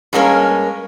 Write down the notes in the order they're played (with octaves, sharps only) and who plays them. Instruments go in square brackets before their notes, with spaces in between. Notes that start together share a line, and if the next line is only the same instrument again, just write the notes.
[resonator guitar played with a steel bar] G2 G#3 A#3 C#4 A#4